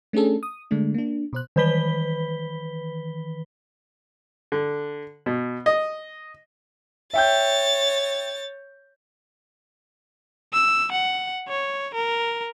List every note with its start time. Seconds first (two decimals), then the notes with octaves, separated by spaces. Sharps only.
0.13 A3 C#4 D4 G#4 A4
0.43 D#6
0.71 D3 G#3 A3 D4
0.94 A#3 D4
1.33 B2 C5 F#6
1.56 D#3 E3 B4 B5 B6 G7
4.52 D3
5.26 B2
5.66 D#5
7.13 C#5 E5 G5 G6 A6
10.53 E6
10.92 F#5
11.49 C#5
11.94 A#4